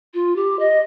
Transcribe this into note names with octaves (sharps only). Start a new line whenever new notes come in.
F4
G4
D#5